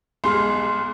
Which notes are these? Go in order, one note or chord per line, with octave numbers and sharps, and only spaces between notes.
B1 G#3 C6 F6